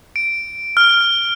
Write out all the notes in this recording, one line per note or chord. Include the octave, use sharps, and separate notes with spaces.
D7
F6